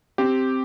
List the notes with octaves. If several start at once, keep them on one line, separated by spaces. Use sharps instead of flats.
C4 G4